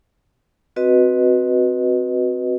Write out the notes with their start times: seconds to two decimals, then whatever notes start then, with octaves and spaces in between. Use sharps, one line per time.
0.76 C4 F#4 B4 D#5